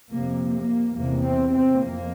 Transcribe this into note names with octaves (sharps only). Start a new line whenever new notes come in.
F2 C3 A#3
A#3
E2 C3 A#3
C4
C4
F2 A#3